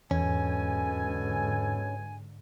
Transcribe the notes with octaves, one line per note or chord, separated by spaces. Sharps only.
E2 G#2 B2 D3 C#4 A4 G#5